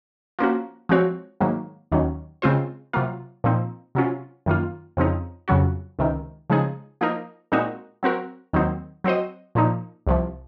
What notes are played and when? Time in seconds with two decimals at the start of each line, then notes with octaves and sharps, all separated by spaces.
0.39 F3 A#3 C#4 F#4
0.89 F3 G#3 C4 F#4 C#5
1.40 G#2 D#3 F#3 A#3
1.92 D#2 D#3 F#3 C#4
2.42 C#3 G#3 C4 F4 C5
2.93 C3 F#3 A#3 F4
3.44 A#2 F3 C4 D#4
3.95 C3 F#3 C#4 F4
4.46 F#2 D#3 A#3 F4
4.97 F2 C#3 F3 C4 D#4
5.48 F2 C#3 F#3 C#4 F#4
5.99 C#2 C3 D#3
6.50 C#3 F3 G#3 D#4 G#4
7.01 F3 A#3 D#4 A#4
7.52 A#2 G#3 C4 D#4 F#4
8.03 F#3 C4 F#4 A#4
8.53 D#2 D#3 F#3 C4 D#4
9.04 F#3 C4 F#4 C5 D#5
9.55 A#2 F3 A#3 D#4
10.07 C2 C3 F3